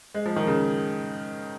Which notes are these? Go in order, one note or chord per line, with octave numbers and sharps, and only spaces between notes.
G#3
F3
D#3
C#3